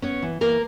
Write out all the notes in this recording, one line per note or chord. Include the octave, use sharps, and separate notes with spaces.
B3 C#4 C#5
E3
E3 A#3 A#4